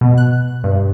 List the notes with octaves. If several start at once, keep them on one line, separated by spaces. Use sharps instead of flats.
B2
F#6
G2